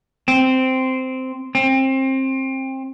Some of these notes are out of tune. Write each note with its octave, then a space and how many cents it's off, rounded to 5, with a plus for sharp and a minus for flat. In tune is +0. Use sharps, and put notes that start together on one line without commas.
C4 -10
C4 +25